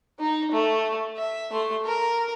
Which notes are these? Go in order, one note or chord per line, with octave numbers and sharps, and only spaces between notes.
D#4
A3
E5
A3 C6
A#4